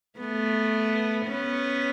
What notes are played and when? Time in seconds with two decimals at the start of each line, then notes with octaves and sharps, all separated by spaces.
0.19 A3 B3
1.26 B3 C#4